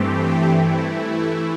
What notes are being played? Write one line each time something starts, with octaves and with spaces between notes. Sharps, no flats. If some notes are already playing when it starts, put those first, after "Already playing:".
Already playing: G2 E3 A3 C4 G4
E3 A3 E4